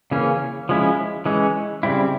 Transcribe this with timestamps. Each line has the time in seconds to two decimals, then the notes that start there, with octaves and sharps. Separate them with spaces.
0.11 C#3 E3 A#3 C#4
0.69 F3 G#3 C#4 E4
1.26 E3 G#3 C#4
1.83 C#3 G3 C4 E4